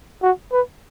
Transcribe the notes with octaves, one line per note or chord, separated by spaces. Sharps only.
F#4
B4